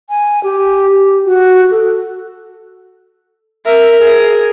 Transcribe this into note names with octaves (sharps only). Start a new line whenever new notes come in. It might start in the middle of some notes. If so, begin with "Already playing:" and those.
G#5
G4
G4
F#4
A4
A#4 E5
G#4